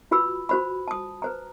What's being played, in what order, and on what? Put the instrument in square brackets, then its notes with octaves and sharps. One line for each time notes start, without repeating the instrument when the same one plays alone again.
[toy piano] F4 F#4 B4 B5 E6
F#4 C5 B5
A5 D#6
B4 C5 A#5